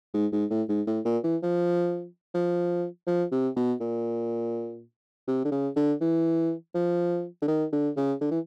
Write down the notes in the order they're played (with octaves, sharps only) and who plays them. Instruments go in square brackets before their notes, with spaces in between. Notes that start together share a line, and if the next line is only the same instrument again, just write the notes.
[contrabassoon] G#2
G#2
A2
G#2
A2
A#2
E3
F3
F3
F3
C3
B2
A#2
C3
D3
C#3
D3
E3
F3
D3
D#3
D3
C#3
D3
E3